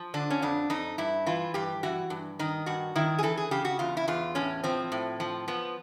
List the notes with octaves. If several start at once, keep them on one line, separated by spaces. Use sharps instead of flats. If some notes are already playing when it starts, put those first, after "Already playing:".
Already playing: F3
D3 D4
C#4
F2 D4
F2 D#4
G2 E4
E3 F4
G2 G4
E3 F#4
G2
D#3 D#4
G2 F#4
D#3 E4
G#4
E3 A4
G#4
C#3 G4
F#4
E2 F4
E4
E2 F4
A2 C#4
F3 C4
A2
F3
F3 B3